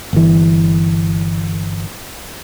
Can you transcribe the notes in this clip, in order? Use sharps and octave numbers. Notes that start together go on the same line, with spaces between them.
G1 E3